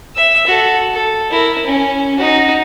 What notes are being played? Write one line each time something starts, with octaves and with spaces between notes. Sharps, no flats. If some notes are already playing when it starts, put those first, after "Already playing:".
E5 E6
F#4 A4
A4
E4 A#4
C#4
D#4 F#4